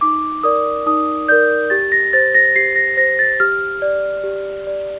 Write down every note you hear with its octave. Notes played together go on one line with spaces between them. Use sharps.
D#4 D6
A#4 D5 D#6
D#4 D#6
A#4 D5 G6
G4 A6
A#6
C5 A6
A#6
G4 C7
A#6
C5 A#6
A6
G4 F6
D5
G4
D5